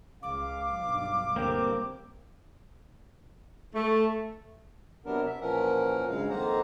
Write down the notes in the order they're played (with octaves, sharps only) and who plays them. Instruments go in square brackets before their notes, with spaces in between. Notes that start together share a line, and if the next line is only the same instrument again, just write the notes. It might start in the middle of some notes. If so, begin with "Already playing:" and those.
[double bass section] C#2 [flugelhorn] F5 [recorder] D6
[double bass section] B1 G2
[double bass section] D2 G2 C3 [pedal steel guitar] A#3 C4 G4
[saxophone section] A3
[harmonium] C3 F#3 B3 D4 A#4
E5
A#2 E3 F3 C#4 A#4 F#5
G2 C#3 F#3 G#3 F5
F2 D#3 A#3 C5 F#5 A#5